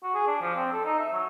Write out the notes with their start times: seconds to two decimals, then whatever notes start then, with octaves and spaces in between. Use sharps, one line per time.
0.03 F#4
0.15 G#4
0.27 D4
0.42 F3
0.56 C4
0.73 A4
0.85 D#4
0.99 E5
1.13 F#3